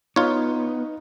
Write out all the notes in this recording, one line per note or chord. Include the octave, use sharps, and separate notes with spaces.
B3 D#4 F4 C#5